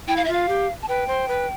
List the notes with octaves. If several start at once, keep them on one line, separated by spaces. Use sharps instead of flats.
E4 G5
F5
E5
F4 F5
G4
A5
B4 G5
C5
B4